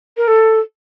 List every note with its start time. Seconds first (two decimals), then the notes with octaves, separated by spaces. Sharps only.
0.17 A#4
0.27 A4